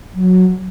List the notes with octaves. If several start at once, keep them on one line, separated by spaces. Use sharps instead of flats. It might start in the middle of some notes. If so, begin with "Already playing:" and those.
F#3